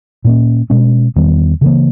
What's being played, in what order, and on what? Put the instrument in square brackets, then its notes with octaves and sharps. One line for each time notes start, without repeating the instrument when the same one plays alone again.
[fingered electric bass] A#2 A#3 C#4
B2 G#3 C#4
E2 D#3 G3 B3
C#3 E3 A#3